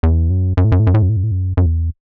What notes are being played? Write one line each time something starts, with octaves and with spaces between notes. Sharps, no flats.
E2
F#2
F#2
A2
F#2
A2
F#2
A2
F#2
A2
F#2
A2
F#2
F#2
E2